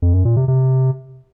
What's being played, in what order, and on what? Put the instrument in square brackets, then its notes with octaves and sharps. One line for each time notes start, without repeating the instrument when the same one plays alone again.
[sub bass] F2
F#2
A#2
C3
C3